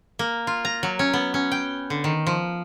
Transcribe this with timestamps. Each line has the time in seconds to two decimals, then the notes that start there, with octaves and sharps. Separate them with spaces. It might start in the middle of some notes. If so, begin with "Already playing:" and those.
0.19 A#3
0.47 F4
0.65 A#5
0.83 F#3
0.99 C#4
1.14 B3
1.34 C#4
1.52 G5
1.90 D3
2.04 D#3
2.27 F3